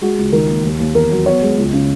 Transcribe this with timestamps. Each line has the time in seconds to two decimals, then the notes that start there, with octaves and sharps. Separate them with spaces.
0.02 G#3 F#4
0.18 C#2
0.32 D#3 A#4
0.48 A#3
0.64 D#2
0.80 D#2
0.95 E2 A#4
1.11 F#3
1.26 B3 C#5
1.42 G#3
1.58 C#2
1.73 C#3